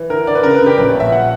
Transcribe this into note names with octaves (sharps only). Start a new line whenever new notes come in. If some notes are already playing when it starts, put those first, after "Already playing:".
Already playing: E3
D3 A#4
D3 D5
B4
C#3 A#4
B4
C#3
G4
A#1 B4
C#5
A#2
E5
F#5